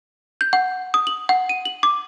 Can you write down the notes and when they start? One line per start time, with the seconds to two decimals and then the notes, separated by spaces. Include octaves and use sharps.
0.41 G6
0.53 F#5
0.94 D#6
1.07 F#7
1.29 F#5
1.49 D#7
1.65 F#7
1.83 D6